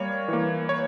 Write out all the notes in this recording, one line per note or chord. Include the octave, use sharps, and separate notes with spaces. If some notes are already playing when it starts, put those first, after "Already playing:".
Already playing: G3 A#3 C#5
E3 A#3
C#5